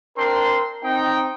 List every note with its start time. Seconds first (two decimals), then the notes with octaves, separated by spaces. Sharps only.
0.17 C4 D4 A#4 C6
0.84 C4 D#4 G5